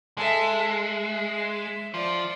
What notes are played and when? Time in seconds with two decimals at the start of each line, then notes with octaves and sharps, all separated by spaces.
0.18 G#3 A4 E5
0.92 E5
1.94 F3 D5